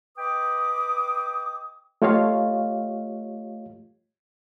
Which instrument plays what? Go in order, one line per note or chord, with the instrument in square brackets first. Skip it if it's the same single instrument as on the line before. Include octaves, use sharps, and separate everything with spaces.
[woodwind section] B4 D#5 G5 D6 D#6
[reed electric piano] A3 F4 G4 C#5 D#5 F5